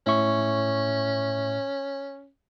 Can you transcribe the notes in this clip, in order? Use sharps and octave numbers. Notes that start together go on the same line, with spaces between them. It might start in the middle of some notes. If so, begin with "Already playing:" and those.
A2 C#4 E5 C#6